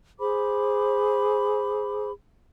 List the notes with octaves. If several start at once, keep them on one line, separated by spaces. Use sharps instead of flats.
G#4 C5 B5 D6